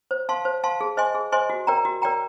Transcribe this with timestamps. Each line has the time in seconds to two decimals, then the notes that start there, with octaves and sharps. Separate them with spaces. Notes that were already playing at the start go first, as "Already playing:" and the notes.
0.11 C5
0.29 F5 A5 C6
0.45 C5
0.64 F5 A5 C6
0.81 G#4
0.97 C5 D#5 G#5 C6
1.15 G#4
1.32 C5 D#5 G#5 C6
1.50 F#4
1.67 A#4 D5 G5 A#5
1.85 F#4
2.02 A#4 D5 G5 A#5